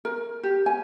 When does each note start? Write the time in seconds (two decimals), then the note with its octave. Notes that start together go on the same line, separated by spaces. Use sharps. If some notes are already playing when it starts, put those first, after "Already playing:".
0.05 A#4
0.43 G4
0.66 G#5